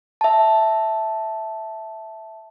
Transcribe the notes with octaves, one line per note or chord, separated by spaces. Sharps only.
E5 A5